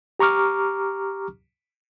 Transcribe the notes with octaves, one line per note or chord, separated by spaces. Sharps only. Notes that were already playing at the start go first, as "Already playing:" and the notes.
G4 A#5 C#6 D6 F6